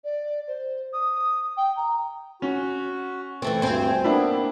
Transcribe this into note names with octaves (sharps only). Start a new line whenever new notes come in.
D5
C5
D#6
G5
A#5
C#4 F#4
E3 A3 C4
D2 G2 C4 C5 G#5
A#3 B3 D4 E4